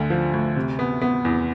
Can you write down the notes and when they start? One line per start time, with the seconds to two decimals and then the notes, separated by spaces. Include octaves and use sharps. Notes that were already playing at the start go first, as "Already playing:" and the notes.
Already playing: D2 D3
0.10 F3
0.34 D2
0.56 C3
0.79 B3
1.01 B3
1.25 E2